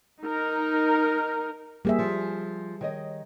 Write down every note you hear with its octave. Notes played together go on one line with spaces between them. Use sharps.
D#4 A#4
G3 A#3 C4 G#4 E5
F3
D#3 C#5 D#5